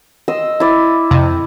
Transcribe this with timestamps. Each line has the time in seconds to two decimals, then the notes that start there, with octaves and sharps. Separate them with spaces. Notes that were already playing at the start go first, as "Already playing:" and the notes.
0.28 D#5 C6 E6
0.60 E4 D5
1.11 F2 C3